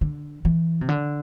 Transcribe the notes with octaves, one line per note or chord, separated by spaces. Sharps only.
D3
E3
C3
D3